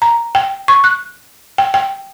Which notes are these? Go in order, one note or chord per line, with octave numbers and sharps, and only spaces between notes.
A#5
G5
C#6
F#6
G5
G5